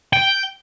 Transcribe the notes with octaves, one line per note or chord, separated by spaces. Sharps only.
G5